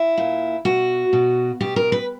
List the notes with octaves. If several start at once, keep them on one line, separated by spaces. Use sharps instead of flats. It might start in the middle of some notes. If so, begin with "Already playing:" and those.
Already playing: E4
A#2
B2 F#4
B2
B2 G4
A#4
B4